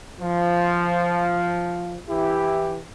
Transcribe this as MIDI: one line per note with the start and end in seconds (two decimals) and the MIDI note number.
0.20 1.97 53
2.09 2.79 52
2.09 2.79 64
2.09 2.79 67